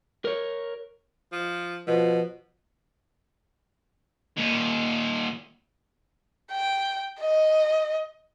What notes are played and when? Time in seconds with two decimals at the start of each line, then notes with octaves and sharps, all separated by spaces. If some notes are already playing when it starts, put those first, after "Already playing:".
0.25 A#4 C#5
1.32 F3
1.87 B2 F3
4.37 D#2 A#2
6.52 G5
7.20 D#5